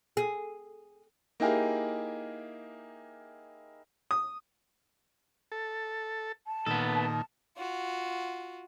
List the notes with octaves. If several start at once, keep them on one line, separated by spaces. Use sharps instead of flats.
G#4
A#3 D#4 E4 G4 G#4 A#4
D#6
A4
A5
A#2 D#3 B3 A4
F4 F#4